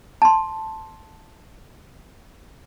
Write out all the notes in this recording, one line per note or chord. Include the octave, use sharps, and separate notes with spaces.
A5 C6